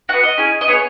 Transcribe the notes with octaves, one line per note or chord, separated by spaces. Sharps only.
B3 F#4 F#5
D#5
C#4 E4 G#4
D#5
B3 E4 C#5
G#4